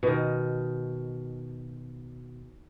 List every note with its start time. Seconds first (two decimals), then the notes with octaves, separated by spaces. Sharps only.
0.03 B2 D#3